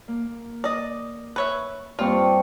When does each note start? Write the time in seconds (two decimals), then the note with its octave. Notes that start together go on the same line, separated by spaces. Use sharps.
0.08 A#3
0.64 D5 D#5
1.36 B4 C#5 E5
1.99 G2 G3 A#3 C4 F4 D5 C#6